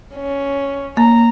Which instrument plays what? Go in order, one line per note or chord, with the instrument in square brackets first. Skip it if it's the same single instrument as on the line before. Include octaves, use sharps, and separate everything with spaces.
[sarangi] C#4
[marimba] A#3 [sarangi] A#5